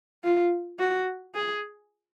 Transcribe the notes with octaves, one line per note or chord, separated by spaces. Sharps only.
F4
F#4
G#4